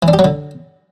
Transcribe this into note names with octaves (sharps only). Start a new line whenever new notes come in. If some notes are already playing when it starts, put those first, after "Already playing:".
E3
D4
G4
F#3
D3